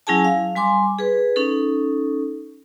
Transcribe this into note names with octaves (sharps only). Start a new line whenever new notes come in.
F#3 C#4 E4 G#4 G#5 A5
F5
G3 G#5 C6 D6
G#4 B4
C#4 D#4 A4